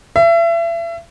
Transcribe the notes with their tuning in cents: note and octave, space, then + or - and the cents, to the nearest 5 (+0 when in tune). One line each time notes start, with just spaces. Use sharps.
E5 +35